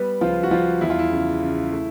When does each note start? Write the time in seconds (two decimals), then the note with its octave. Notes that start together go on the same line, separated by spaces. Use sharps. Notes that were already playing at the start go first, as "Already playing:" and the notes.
Already playing: G3 B3 B4
0.21 C#2 F3 F4
0.43 F#4
0.51 F3 G3 F4
0.81 E2 E4
0.90 F4
0.99 E4
1.11 C#3
1.41 C#3
1.71 A3